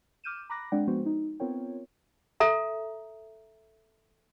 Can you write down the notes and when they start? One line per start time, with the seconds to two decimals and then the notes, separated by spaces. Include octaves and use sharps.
0.24 D6 F6 G6 D#7 E7
0.50 A#5 B5 D6 F#6 A#6
0.72 G#3 C4 D4 D5 F#5 G5
0.88 F3 G#3 B3 F#4 C5
1.06 D#4
1.40 B3 C4 F4 A#4 C#5 G5
2.40 A4 E5 A#5